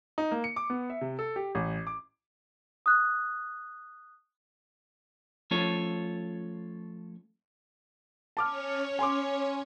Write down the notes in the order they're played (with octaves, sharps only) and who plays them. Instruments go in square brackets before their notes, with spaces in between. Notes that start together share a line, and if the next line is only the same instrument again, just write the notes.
[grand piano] D#4
A#3
C#7
D6
B3
E5
C3
A4
G4
A1
D6
[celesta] D#6 F#6
[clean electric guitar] F3 A3 C#4 F4 A4 C#5
[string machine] C#4 C#5 [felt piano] A5 D6 F6
[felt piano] G#5 C6 D6